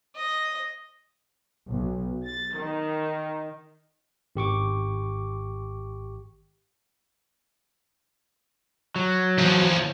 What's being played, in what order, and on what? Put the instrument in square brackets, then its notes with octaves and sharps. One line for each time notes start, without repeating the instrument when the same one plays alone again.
[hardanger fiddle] D#5
[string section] B1
A6
D#3
[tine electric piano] G#1 G4 C#6 D6
[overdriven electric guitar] F#3
[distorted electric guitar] E2 F3